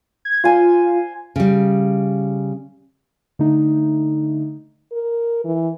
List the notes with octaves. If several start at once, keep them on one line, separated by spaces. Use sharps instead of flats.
G#6
F4 C5 G#5
C#3 G3
D3 A3 D#4
A#4
E3